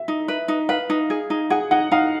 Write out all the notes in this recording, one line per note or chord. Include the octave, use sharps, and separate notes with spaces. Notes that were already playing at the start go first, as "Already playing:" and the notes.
Already playing: E5
D#4
B4
D#4
B4 F5
D#4
G#4
D#4
G#4 F#5
D#4 F#5
D#4 F5